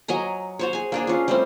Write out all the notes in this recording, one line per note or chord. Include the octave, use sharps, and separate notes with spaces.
F#3 D#5 G#5 A#5
F#4 C5 C#5
G#4 G#5
A#3 D4 G#4
C#4 F4
G3 A3 C4